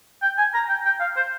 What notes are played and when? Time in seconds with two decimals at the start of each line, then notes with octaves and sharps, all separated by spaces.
0.23 G5
0.38 G#5
0.55 A#5
0.69 G5
0.85 G5
1.00 F5
1.16 C5